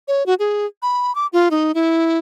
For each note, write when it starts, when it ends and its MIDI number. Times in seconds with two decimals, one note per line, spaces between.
0.08 0.26 73
0.26 0.34 66
0.39 0.66 68
0.82 1.14 83
1.15 1.27 86
1.33 1.49 65
1.51 1.72 63
1.75 2.18 64